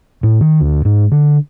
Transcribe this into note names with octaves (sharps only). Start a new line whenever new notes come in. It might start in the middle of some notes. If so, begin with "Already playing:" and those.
A2
D#3
D2
G#2
D3